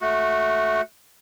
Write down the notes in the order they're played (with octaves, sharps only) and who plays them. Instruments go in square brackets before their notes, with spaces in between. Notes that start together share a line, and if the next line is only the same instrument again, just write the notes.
[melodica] A3 F#4